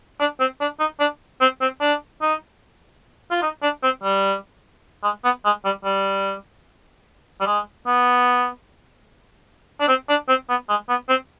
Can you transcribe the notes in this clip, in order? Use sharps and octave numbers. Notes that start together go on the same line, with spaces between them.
D4
C4
D4
D#4
D4
C4
C4
D4
D#4
F4
D#4
D4
C4
G3
G#3
B3
G#3
G3
G3
G3
G#3
B3
D4
C4
D4
C4
B3
G#3
B3
C4